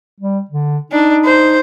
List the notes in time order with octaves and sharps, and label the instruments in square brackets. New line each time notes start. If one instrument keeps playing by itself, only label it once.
[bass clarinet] G3
D3
[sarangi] D4 [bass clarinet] D#4
[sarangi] C5